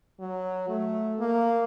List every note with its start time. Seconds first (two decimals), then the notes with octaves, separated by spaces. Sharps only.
0.20 F#3
0.69 A3
1.19 A#3